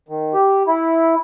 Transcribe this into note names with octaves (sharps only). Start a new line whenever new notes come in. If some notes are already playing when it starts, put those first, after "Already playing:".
D#3
G4
E4